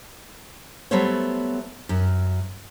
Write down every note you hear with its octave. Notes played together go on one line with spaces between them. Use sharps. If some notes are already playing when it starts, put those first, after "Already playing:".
F#3 G3 A3 B3 C5 C#5
F#2